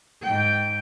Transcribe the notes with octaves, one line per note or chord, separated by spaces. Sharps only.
G#2 G5